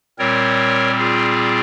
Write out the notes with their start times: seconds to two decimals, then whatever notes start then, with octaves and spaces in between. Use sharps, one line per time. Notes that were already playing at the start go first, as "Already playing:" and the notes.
0.18 A#2 G3 C4 A#4 C#5
0.99 F4 G#4